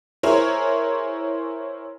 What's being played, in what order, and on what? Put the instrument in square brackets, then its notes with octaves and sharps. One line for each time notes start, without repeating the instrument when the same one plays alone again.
[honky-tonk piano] E4 G#4 A#4 C5 C#5